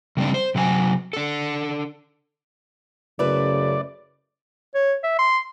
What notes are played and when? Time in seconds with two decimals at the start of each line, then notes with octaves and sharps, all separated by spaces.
0.17 C#3 G3 C4 D4
0.34 C5
0.55 C3 F#3 A#4 G#5
1.13 D4 A4
3.19 F#2 C#3 A3 E4 B4 D5
4.74 C#5
5.03 E5
5.19 C6